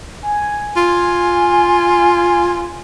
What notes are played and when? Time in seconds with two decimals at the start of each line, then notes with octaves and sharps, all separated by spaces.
0.23 G#5
0.77 F4